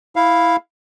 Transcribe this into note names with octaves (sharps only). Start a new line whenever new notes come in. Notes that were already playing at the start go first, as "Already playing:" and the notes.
E4 F5